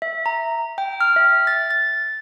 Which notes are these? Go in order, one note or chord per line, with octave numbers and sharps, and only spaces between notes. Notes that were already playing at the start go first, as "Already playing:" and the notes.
E5
A#5
G5
F6
E5
A6
A6